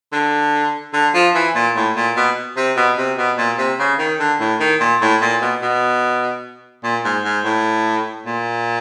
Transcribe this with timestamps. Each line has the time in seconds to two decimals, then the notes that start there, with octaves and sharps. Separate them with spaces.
0.13 D3
0.93 D3
1.14 F3
1.35 E3
1.55 A#2
1.76 A2
1.96 A#2
2.17 B2
2.57 C3
2.77 B2
2.97 C3
3.17 B2
3.37 A#2
3.58 C3
3.79 C#3
3.99 D#3
4.19 D3
4.40 A2
4.60 D#3
4.80 A#2
5.01 A2
5.21 A#2
5.42 B2
5.62 B2
6.84 A#2
7.04 G#2
7.24 G#2
7.45 A2
8.26 A#2